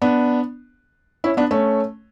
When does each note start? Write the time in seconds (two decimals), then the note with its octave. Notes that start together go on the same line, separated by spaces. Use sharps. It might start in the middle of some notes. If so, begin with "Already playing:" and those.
0.02 B3 D4
1.24 C#4 E4
1.37 B3 D4
1.51 A3 C#4